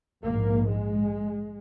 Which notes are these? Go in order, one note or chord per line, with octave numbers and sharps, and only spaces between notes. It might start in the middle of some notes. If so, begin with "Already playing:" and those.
A#1 G#2 A#3
G#3